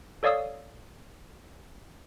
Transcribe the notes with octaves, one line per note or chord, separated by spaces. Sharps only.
A4 C#5 D5 F5 D#6 E6